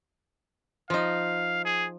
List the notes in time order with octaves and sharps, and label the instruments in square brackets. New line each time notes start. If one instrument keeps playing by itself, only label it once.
[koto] F3 D#4 [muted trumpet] F5
[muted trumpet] G#4